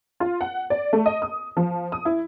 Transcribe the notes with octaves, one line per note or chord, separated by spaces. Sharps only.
F4
F#5
D5
A3
D#5
D#6
F3
D#6
E4